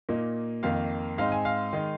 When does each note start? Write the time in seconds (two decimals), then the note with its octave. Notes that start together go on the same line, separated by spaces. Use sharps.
0.09 A#2 A#3 D#4
0.63 F2 D#3 A#3 F5
1.18 G#2 G#3 C4 D#4 F5
1.32 G#5
1.45 F5
1.73 D#3 G#3 D#4